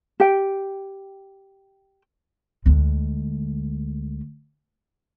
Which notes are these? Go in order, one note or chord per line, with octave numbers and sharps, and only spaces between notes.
G4 G5
D2 G#3